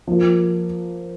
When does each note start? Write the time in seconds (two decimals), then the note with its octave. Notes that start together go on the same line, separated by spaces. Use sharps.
0.07 F3 A#3 F4